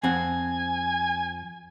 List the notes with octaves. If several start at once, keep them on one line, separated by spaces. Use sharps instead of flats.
F2 C4 F#5 G#5